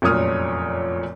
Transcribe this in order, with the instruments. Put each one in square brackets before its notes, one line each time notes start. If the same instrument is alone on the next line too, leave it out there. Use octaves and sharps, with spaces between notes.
[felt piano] F1 F#2 A#2 C#5 D#6 F6